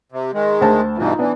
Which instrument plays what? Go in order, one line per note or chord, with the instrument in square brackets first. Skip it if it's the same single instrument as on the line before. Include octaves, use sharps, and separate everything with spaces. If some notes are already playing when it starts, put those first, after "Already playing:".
[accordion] C3
D#3 G#3
[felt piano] D2 C5 A5
[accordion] G2 B2 E3 [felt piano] D#4 F4
[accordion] E3 [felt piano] B3 D4